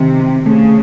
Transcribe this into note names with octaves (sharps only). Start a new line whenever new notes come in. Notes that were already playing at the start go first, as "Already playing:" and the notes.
Already playing: C3 D#3
C4
C#3 A3